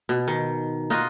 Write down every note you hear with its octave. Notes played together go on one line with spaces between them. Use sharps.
B2
D#3
D#4 F4 F#4 D#5